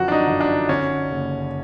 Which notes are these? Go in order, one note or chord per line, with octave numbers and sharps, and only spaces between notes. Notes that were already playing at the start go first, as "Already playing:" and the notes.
Already playing: F#2 D3 F3 F#4
D4
D#4
G1
D4
D3 C#4
F#1